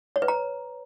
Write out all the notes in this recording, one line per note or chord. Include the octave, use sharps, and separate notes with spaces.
C#5
B4
A#5